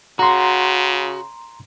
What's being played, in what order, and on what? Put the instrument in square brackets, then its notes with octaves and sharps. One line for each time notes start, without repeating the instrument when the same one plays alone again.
[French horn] C#3 [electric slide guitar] F#4 [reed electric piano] A#5 C6